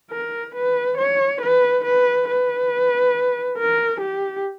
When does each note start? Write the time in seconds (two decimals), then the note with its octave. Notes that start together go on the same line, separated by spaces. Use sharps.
0.11 A#4
0.55 B4
0.97 C#5
1.41 B4
1.84 B4
2.28 B4
3.58 A#4
4.00 G4